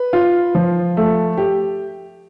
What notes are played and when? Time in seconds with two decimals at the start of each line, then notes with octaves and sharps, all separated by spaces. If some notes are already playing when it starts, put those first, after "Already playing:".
Already playing: B4
0.13 F4
0.55 F3
0.97 A3
1.37 G4